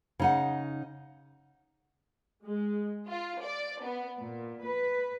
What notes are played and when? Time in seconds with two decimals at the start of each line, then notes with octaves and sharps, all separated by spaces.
0.19 C#3 D#4 F#5
2.43 G#3
3.08 F4
3.43 D5
3.83 B3
4.21 A#2
4.64 B4